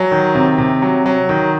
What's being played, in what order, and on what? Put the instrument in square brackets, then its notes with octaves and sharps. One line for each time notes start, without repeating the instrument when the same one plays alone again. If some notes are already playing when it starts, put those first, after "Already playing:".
Already playing: [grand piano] F#3 G#5
D#3
C3
C3
F#3
F#3
D#3